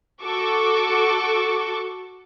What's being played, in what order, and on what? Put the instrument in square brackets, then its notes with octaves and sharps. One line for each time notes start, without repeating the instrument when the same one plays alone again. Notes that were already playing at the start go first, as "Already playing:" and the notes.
[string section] F#4 A4 C#6 D6